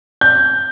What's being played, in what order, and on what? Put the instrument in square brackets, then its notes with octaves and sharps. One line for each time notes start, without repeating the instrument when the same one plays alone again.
[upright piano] G6